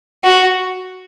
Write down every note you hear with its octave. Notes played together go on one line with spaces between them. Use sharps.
F#4